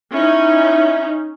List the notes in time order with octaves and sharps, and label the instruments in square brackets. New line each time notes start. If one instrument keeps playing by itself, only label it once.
[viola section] C#4 D#4 [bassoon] E4